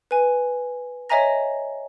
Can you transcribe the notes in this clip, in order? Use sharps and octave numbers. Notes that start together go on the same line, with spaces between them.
B4 G#5
C#5 D#5 E5 G#5 A#5 A#6